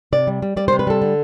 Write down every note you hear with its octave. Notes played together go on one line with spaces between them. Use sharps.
C3 D5
G3
G3
G3 D5
C5
C3
B4
G3 A4
D3